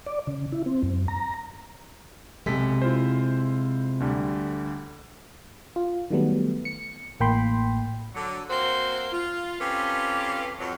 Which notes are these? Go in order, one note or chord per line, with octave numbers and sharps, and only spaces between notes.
D5
C#3
E4
C4
F#2
A#5
B1 C3 G#3 A4 B6
E4 F4 C5
D2 D3 G3
F4
D#3 F#3 G3 A3 B3
C#7
A1 A2 A#3 G5 B5 C6
D3 F#3
A#3 C4 F#4 C5
F4
C4 C#4 F4 G4 A4 B4
F2 F#3